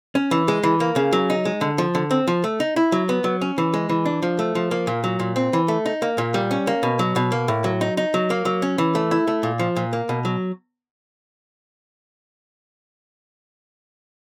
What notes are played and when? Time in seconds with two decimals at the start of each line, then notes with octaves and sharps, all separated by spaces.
0.15 C#4
0.31 E3
0.48 G#3
0.63 E3
0.80 A#3
0.96 C#3
1.12 F#3
1.30 D#4
1.45 G#3
1.61 D3
1.78 F3
1.95 D3
2.11 C4
2.27 F3
2.44 A3
2.60 D#4
2.76 E4
2.92 F#3
3.09 B3
3.24 F#3
3.41 C#4
3.58 E3
3.74 G#3
3.89 E3
4.05 D4
4.22 F3
4.39 A3
4.55 F3
4.71 A#3
4.87 A#2
5.04 F#3
5.20 A#2
5.36 C4
5.53 E3
5.68 A3
5.85 D#4
6.02 A#3
6.18 A#2
6.34 G3
6.51 C#4
6.67 A#3
6.83 B2
6.99 F#3
7.16 B2
7.32 A#3
7.48 A2
7.64 F#3
7.81 D#4
7.97 D#4
8.14 F#3
8.30 A#3
8.45 F#3
8.62 C#4
8.78 E3
8.95 A3
9.11 E4
9.27 A3
9.43 A#2
9.59 F3
9.76 A#2
9.93 A#3
10.09 B2
10.25 F#3